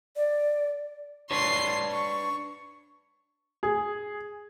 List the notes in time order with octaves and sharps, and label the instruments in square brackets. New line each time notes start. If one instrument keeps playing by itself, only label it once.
[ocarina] D5
[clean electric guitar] D4 B4 C#5 [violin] C6 C7
[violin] C#6
[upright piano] G#4